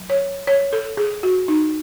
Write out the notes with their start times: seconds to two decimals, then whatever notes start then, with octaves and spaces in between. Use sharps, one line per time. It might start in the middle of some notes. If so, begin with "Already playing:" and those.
Already playing: F#3
0.10 C#5
0.47 C#5
0.73 A4
0.97 G#4
1.23 F#4
1.48 D#4